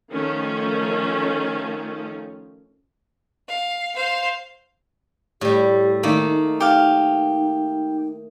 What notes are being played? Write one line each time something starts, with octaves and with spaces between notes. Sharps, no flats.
D#3 F3 A3 C#4
F5
C5 F5
A2 G3 G4
D#3 A3 A#3 D#4
G4 F5